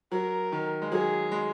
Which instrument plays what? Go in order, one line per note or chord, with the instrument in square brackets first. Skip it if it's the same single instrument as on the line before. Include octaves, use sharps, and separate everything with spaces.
[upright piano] F#3 [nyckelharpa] A#4
[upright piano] D#3
G#3
[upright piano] F#3 [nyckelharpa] G#4
[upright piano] G#3